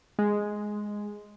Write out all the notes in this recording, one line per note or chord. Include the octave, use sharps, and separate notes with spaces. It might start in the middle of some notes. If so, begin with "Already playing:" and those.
G#3